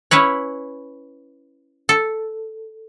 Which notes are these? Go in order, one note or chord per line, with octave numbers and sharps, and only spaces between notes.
C#4 E4 B4 C#5
A4